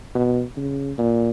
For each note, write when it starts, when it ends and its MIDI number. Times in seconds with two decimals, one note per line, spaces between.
0.15 0.42 47
0.56 0.92 49
0.98 1.31 46